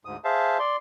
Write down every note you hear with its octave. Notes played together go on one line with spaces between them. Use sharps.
D2 G#2 D#6
G#4 C5 E5 F5 A5
D5 C6